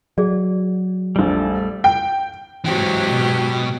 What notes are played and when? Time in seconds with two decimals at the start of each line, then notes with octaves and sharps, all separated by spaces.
0.18 F#3 G#4 D5
1.16 A#1 F2 G3 A3
1.84 G5
2.65 G#2 E3 F#3 C4 G4
3.12 B2